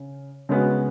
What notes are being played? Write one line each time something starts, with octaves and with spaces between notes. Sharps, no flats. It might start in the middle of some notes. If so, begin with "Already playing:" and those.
Already playing: C#3
C#3 G#3 B3 F#4 B4